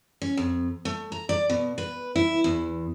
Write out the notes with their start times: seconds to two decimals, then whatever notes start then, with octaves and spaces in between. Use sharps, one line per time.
0.22 C#4
0.37 F2
0.85 A3
1.12 A#5
1.29 D5
1.50 B2
1.78 B4
2.16 E4
2.44 E2